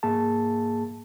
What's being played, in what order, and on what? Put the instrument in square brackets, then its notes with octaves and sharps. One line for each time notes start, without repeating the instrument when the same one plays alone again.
[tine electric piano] G#2 A#3 G#4 A5